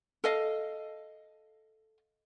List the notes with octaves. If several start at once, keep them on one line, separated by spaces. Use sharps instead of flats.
A4 D#5 F5